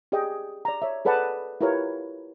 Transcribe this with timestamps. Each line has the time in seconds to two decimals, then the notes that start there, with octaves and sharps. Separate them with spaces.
0.12 G4 G#4 D5 D#5 G5
0.65 D5 A#5
0.82 C#5 E5
1.05 G#4 A4 B4 D5 F#5 A5
1.61 E4 F4 G4 A#4 B4 C#5